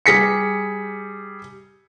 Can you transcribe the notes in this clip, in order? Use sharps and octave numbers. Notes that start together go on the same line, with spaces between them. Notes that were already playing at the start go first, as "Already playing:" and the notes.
G3 G#4 B6 C#7